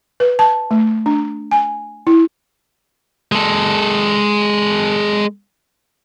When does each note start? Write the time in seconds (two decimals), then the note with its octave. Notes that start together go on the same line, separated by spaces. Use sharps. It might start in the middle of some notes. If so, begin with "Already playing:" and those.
0.20 B4
0.39 A5
0.71 A3
1.06 D4
1.51 G#5
2.07 E4
3.32 G#3 A4